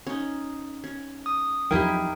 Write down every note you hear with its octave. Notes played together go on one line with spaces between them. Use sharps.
C#4 D#4
C#4
D#6
E2 F3 F#3 D#4 E4 G4 A#4 G5